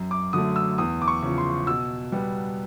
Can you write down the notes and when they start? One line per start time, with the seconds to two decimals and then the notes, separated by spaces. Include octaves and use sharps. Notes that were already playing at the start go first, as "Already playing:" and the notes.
Already playing: F#2
0.11 D6
0.33 D3 F#3 A3 D#6
0.56 E6
0.78 E2 D#6
1.02 D6
1.08 C#6
1.22 C#3 F3
1.38 C6
1.67 B2 E6
2.12 G3 B3